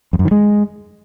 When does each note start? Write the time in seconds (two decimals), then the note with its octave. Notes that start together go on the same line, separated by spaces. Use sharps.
0.13 F2
0.19 F#2
0.25 D#3
0.31 G#3